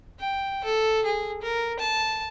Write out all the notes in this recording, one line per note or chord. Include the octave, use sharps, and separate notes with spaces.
G5
A4
G#4
A#4
A5